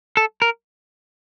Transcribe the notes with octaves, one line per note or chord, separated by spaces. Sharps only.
A4
A#4